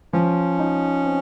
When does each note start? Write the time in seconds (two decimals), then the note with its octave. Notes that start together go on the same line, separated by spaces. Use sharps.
0.13 F3 C#4
0.59 D#4
1.05 C4